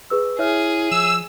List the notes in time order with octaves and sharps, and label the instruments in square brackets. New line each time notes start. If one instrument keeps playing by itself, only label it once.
[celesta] G#4 B4 E6
[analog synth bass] E4 [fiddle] G#4 [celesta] C#5 E5 F6
[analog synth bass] F3 [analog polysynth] E6